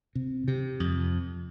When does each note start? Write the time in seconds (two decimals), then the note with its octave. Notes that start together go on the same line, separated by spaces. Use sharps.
0.15 C3
0.48 C3
0.80 F2